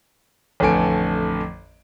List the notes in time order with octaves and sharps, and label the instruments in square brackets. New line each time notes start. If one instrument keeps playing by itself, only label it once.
[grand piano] A1 F2 D3 A3 G#5 D7